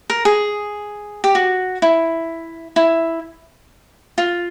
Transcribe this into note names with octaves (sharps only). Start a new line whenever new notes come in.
A#4
G#4
G4
F#4
E4
E4
F4